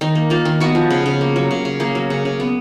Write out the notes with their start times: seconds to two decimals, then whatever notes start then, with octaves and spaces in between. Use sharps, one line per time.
0.01 D#3 D#4
0.15 A#3
0.30 A#3 F4
0.45 D#3
0.60 B3 F#4
0.75 F3
0.90 C#3
1.06 C#3
1.21 A#3
1.36 F#3
1.51 C#3
1.65 C#3
1.80 A#3 G#4
1.95 F#3
2.10 C#3
2.25 C#3
2.40 B3